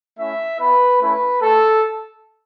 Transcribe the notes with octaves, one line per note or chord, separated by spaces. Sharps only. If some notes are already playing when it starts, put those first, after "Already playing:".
A3 C#4 E4 E5
B3 E4 B4
A3 C#4 E4 B4
A3 A4